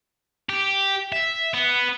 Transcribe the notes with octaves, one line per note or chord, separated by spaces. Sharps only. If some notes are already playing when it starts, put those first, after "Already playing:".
G4
E5
B3